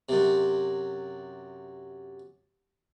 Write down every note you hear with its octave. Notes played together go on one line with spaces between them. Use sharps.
F#2 C3